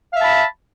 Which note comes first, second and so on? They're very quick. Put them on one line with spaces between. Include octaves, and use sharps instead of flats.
F5 E5 A5 B5